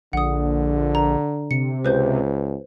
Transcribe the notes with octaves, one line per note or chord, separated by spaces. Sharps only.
A#1 D3 F#5 D#6
A#5
C3 C#7
C#2 B4 C5 G6